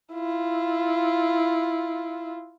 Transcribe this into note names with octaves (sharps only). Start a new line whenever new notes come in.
E4 F4